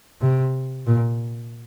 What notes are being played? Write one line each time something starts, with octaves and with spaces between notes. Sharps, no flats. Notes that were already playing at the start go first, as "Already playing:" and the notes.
C3
A#2